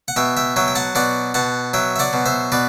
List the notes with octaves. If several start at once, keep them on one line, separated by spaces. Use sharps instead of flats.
F#5
B2 E5 G5
E5 G5
F#3 E5 G5
G5
F#5 A5
B2 D5 F#5
B2 F#5 A5
F#3 E5 G5
E5
D5 F#5
B2
C5 E5
B2 B4 D5